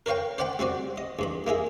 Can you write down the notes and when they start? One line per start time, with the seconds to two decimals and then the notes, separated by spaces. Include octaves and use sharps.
0.06 A#4 B4 C#5 F5 G5
0.38 C5 D5 F#5 G5 B5
0.59 G3 C4 F#4 D5
0.98 D#5
1.19 E2 G2 B5
1.47 A#3 D#4 G#4 E5